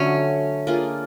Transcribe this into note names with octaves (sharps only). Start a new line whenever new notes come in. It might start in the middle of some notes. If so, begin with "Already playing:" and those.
Already playing: D3 F#3 A3 C#4
A#3 D4 F4 G#4